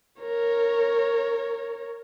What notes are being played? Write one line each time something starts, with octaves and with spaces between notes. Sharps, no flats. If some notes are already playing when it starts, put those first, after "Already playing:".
A#4 C#5